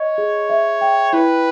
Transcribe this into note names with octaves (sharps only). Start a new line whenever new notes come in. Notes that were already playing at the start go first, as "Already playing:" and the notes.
Already playing: C#5 D#5
G#4
E5
G5
E4 B4